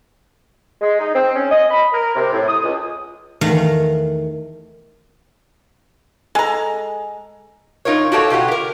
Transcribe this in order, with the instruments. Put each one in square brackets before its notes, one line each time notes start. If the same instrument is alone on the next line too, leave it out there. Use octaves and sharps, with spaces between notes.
[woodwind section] G#3
D#4
C4
C#4
D#5
B5
A#4
C3
A2
D#6
C#2
[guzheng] E2 D#3 A3 F5 F#5 A#5
[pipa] G#3 A#5 [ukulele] A4 G#5
[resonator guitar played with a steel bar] D#4 F4 A#4 C#5
F#4 G4 A4 C#5 F5
B2 F4 G4 F#5
G4 A#4